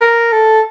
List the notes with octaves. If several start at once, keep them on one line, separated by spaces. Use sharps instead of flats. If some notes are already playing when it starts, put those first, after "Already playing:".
A#4
A4